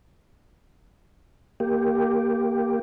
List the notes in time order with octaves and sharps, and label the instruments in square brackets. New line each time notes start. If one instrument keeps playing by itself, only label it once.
[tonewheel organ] A#3 G4